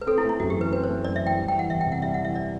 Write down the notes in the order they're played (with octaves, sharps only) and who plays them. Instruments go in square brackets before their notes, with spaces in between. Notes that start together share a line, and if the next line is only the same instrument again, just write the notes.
[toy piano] B4
[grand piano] C4 [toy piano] A4
[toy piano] E4
[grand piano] A3
[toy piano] E4
[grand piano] F#2 [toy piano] F#4
[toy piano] G4
[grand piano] E3
[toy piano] B4
[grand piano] C4 [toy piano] B4
[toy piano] C5
[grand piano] A3
[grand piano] F#2 [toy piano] D5
[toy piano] E5
[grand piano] E3
[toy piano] G5
[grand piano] G3
[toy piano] G5
[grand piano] E3 [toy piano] F#5
[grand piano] E2 [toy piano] E5
[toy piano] G5
[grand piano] C3
[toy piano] F#5
[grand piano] G3 [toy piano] E5
[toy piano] F#5
[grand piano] E3
[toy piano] E5
D5